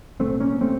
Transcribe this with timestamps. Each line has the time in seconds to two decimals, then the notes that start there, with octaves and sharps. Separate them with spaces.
0.19 C2 A#2 A3 C4
0.40 A#3 C#4
0.61 C3 A3 C4